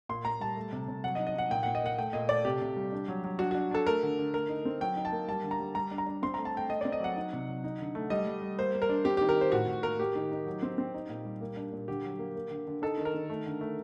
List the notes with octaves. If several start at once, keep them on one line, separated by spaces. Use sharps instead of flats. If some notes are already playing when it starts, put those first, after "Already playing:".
A#2 C6
A#2 A#5
G3 A5
A3
C3
C3
F#3 F#5
D#5
D#4
D#5
D#4 F#5
A#2 G5
A#2 F#5
D#5
A#3 F#5
A3 G5
A#2 D#5
A3 D5
C3 G4
C3
G3
D4
F#3
F#3
D4 F#4
D4 F#4
D4 A4
A3 A#4
D3
D3
A3 A#4
D#4
C4
F#3 G5
D#4
A5
A#3
G3 A5
D3
A#5
G3
G3 A#5
D4
A#5
D4
C4 C6
A3 A#5
A5
A3 G5
A3 D#5
C4 D5
D#5
F#3 F#5
D#4
C3
F#3
D#4
D3
A3
G3 D#5
G3
G3
A#3 C5
A#3
A#4
D4
C4 G4
D#3 G4
A#4
D#3
C5
A2 F#4
A2
A#3 A#4
A#3 G4
D#3
D#4
F#3
C4
C4
D#4
A#2
G3
A#3
D4
A#2
D3 G4
F#3
A#3
A#3
D3
D3
D#4 A4
D#3
A#4
D#3
A3
D3
A3